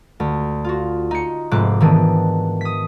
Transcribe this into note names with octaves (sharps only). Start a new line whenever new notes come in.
D2
F4 F#4
D#4 C#7
F1 G#2 D6 F#6 C7
D#3 E3 B3 D4
D#6 B6